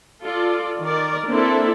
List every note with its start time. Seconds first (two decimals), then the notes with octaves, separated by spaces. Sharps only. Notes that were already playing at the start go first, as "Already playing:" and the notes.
0.24 F4 A4 D5
0.82 D#3 A#4 D5
1.27 A#3 C4 D4 E4 A4